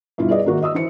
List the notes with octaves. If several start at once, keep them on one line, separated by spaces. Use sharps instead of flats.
G2 B2 E4 F4
G#4 B4 D5 D#5
G#1 A#3 F#4
D#5 D#6 E6
E3 C5 C#7